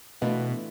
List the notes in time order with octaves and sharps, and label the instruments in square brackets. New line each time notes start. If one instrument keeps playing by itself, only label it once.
[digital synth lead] B2 [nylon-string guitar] E3 A3 D4 F4 A#4